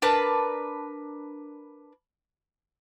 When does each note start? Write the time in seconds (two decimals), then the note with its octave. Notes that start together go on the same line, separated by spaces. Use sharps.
0.02 D4 A#4 B4 A5